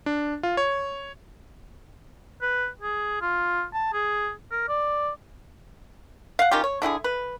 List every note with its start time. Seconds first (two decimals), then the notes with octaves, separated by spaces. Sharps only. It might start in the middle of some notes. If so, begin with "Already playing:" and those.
0.06 D4
0.43 F4
0.57 C#5
2.41 B4
2.81 G#4
3.21 F4
3.73 A5
3.93 G#4
4.51 A#4
4.69 D5
6.39 F5 F#5
6.51 D#3 C#4 F4 G4
6.64 C#5
6.82 D3 E4 G4 G#4
7.04 B4